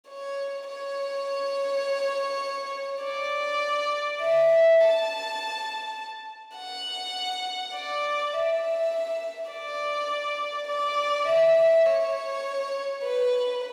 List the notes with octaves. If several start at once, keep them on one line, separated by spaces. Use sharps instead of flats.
C#5
C#5
D5
E5
A5
F#5
D5
E5
D5
D5
E5
C#5
B4